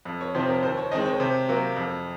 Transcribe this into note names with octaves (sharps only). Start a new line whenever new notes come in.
F2
C#5
C3 F3 C4 D#4 C5
A#4
D#2 C5
C#5
D#3 G#3 C4 D#4 D#5
C#5
C3 C5
F#3 A#3
F2